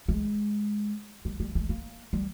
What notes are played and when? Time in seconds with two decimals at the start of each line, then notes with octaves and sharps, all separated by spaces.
0.09 G#3
1.25 G3
1.40 G3
1.55 G#3
1.69 A#3
2.13 G3